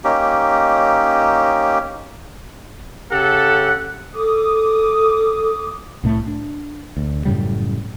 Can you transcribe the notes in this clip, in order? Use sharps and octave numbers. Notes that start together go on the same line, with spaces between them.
A#3 C#4 D#4 G4
C#3 G4 A4 F#5
A4 D6 D#6
C2 A2 A3
D4
D2
F#2 A2 C#3 G3